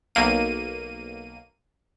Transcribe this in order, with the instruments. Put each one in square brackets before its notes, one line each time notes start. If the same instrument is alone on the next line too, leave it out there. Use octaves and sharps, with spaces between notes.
[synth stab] B1 A#3 D#7